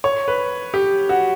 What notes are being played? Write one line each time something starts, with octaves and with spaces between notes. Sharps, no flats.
C#5
B4
G4
F#4